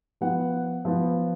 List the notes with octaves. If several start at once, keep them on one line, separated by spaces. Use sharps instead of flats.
F3 B3 F#5
F3 B3